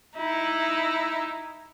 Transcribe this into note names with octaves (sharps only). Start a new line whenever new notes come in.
D#4 E4